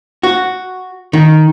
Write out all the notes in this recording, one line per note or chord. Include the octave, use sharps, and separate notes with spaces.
F#4
D#3